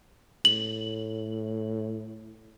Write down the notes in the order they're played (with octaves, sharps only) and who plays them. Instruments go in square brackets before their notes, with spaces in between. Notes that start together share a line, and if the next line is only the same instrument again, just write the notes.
[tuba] A2 [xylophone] F#7